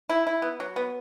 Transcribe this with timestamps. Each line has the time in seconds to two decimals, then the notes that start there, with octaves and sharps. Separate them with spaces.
0.09 E4
0.27 E4
0.42 B3
0.60 F#3
0.76 B3